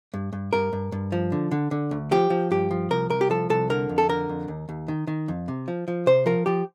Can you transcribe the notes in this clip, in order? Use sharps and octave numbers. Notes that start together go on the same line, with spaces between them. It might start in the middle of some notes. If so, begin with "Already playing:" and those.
G2
G2
G2 A#4
G2
G2
F3
D3
D3
D3
D2
F3 G4
F3
G2 G4
F3
C2 A#4
C2 A#4
G4
F3 A4
C2 A4
D3 A#4
F2
A4
D3 A#4
F2
D#2
D#2
D#3
D#3
F2
C3
F3
F3
C3 C5
F3 A#4
F3 G4